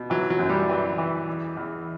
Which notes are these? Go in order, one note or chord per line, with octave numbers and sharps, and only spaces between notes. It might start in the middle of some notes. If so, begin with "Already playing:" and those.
Already playing: B2
E3 F#3
F#3
F#2
G3
E3
E3
E2
E2